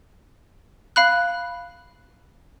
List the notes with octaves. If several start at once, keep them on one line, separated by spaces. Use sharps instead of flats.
F5 B5 F#6